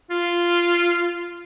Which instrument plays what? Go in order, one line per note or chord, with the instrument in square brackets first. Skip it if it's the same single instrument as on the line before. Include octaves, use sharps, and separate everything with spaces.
[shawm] F4